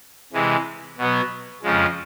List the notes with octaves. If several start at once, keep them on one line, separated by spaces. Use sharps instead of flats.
C3 E3 G#3
B2 F#3 B3
F2 C#3 F3 G#3